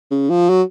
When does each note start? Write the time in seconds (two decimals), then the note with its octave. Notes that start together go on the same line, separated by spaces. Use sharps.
0.11 C#3
0.30 F3
0.50 F#3